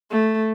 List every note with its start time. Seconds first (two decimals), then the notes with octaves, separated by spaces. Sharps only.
0.11 A3